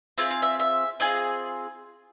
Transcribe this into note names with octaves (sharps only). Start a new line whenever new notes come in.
C4 F4 G#4 E5
F5
E5
E5
C4 F4 G#4 D#5